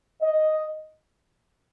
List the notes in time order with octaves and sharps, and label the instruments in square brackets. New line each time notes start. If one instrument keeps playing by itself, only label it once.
[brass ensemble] D#5